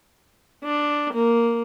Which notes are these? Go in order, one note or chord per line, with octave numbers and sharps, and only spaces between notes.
D4
A#3